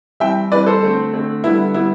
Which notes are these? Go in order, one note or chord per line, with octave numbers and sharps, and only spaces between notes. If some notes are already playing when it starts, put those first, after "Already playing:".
E3 G3 C4 E5 G5
E3 G3 C4 B4 D5
A4 C5
D3 A3 C4
D3 A3 C4
D3 G3 B3 E4
D3 G3 B3 E4